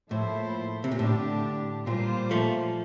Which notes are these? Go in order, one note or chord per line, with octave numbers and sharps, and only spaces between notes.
A2 F3 A#3 E4 A4 C5
C3
A#2
A2 D3 A3 D4 G4
A#2 G3 A#3 F4 C5
F3 A3